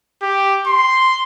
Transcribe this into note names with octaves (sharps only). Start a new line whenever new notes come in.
G4
C6